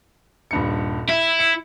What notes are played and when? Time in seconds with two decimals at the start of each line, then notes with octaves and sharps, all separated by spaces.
0.51 D#1 G2 C#7
1.09 E4 E5
1.39 C#7